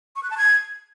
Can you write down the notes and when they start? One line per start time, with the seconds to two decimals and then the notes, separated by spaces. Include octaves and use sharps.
0.16 C#6
0.23 F#6
0.30 A5
0.38 G#6